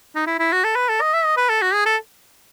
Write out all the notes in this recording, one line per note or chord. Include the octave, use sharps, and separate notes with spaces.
D#4
E4
E4
F#4
A4
B4
A4
D#5
E5
D#5
B4
A4
F#4
G#4
A4